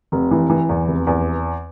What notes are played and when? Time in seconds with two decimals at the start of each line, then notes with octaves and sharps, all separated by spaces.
0.12 F1
0.31 E3
0.50 E3
0.69 E2
0.88 F1
1.07 E2